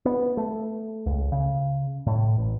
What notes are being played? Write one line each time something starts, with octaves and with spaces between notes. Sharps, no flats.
B3
A3
C#2
C#3
A2
A1